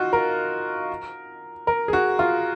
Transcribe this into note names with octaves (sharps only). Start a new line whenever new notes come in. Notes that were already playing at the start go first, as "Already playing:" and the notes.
Already playing: D#4 F4 F#4
A#4
A#4
G#4
F#4
F4